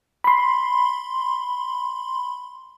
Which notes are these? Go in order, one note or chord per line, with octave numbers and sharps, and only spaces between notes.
B5 C6